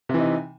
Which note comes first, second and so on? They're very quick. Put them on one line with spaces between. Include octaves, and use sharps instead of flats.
C3 E3 D#4